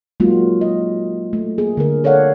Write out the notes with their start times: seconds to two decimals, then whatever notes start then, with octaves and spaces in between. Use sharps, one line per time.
0.20 F#3 G#3 A#3 D#4 F4 F#4
0.61 D#5
1.33 A3
1.58 A#3 G#4
1.77 D3 G#4 A#4
2.04 A4 C#5 D5 F5 F#5